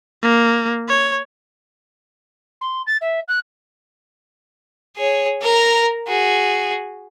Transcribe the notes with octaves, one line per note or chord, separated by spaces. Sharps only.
A#3
C#5
C6
A6
E5
F#6
G#4 C#5
A#4 A#5
F#4 G#4